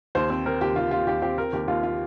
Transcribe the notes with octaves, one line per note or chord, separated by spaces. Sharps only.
D#2 C5
C4
C4 A#4
D#2 G4
D#2 F4
D#2 F4
D#2 G4
C4 G4
C4 A#4
D#2 G4
D#2 F4
F4